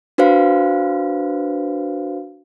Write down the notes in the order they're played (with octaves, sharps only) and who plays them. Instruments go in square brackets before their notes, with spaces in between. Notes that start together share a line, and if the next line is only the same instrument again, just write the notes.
[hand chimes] D4 F#4 B4 C5 F5